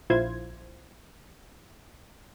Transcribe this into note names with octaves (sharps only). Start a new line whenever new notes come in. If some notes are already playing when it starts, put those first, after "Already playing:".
A#1 E4 F4 C5 G#6